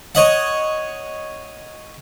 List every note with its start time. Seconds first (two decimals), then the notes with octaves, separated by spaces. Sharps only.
0.15 C#5 D#5 F#5